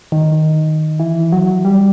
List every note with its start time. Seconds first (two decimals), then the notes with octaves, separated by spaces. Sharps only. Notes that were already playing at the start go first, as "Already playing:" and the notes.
0.12 D#3
1.00 E3
1.32 F#3
1.65 G3